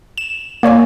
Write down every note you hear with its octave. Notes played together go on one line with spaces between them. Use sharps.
E7
A#3 C#5 D5 G#5